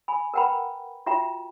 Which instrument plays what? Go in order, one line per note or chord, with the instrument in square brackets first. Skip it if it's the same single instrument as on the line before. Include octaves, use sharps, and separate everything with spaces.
[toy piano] G#5 B5
A#4 B4 F#5 G5 A#5 B5
F4 F#4 E5 G5 A#5